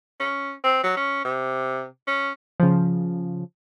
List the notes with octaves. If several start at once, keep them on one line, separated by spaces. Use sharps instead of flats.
C#4
C4
F#3
C#4
C3
C#4
C#3 F3